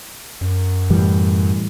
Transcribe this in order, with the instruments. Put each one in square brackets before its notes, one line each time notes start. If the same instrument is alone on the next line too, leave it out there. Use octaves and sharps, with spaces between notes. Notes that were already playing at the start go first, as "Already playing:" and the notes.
[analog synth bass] F#2
[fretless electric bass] A2 E3 G3